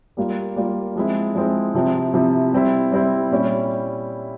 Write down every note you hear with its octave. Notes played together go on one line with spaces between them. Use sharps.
G3 A#3 F4
G3 A#3 F4
F3 G#3 C4 E4
F3 G#3 C4 E4
C3 F3 C4 E4
C3 F3 C4 E4
G3 C4 E4
G3 C4 E4
A#2 G3 C#4 E4